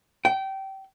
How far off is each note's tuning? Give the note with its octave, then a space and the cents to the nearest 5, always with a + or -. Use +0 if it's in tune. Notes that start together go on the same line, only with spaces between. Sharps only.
G5 -25